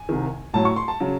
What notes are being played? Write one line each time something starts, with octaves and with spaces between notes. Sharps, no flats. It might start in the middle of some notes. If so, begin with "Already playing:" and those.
Already playing: G#5
C2 C3 D#3
A1 A2 F#3 A5
C#6
C6
A5
C#3 F#3